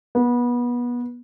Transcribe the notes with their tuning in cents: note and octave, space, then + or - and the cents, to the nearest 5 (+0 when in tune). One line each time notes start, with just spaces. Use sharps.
B3 -25